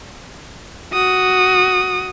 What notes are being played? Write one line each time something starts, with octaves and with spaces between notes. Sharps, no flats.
F#4 D#6